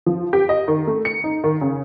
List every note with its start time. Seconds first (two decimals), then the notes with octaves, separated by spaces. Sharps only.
0.06 F3
0.33 G4
0.49 D#5
0.68 D#3
0.87 A3
1.05 C#7
1.24 D#4
1.44 D#3
1.61 C#3